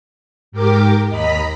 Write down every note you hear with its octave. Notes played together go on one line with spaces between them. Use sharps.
G#2 G4 A#4 D6
D#2 D#5 A#5 B5 B6